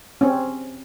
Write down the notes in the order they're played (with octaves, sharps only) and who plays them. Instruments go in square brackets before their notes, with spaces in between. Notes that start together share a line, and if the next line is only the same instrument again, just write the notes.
[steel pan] C4 C#4